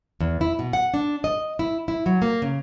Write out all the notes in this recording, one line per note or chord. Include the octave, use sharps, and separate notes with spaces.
E2
E4
B2
F#5
D4
D#5
E4
E4
F#3
A#3
C#3